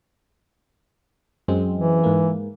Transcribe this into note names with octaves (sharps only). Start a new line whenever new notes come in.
F#2 G#3 C4
E3
G#2 A#3